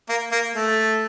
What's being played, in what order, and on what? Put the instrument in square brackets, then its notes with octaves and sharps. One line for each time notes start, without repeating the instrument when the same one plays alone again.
[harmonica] A#3
A#3
A3